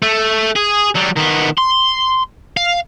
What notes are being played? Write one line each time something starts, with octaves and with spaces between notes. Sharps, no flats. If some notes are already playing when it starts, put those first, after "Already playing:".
A3
G#4
F#3 G3
D#3 B3
C6
F5